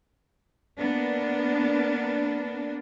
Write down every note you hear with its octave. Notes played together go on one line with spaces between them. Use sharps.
A#3 B3 D4